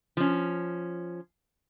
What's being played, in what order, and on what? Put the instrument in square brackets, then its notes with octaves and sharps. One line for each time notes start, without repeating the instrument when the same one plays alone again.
[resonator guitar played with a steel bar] F3 C#4